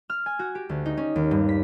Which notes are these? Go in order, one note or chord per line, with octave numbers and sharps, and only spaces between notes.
F6
G#5
F#4
G4
D2
D#4
C#4
D#2
G2
B6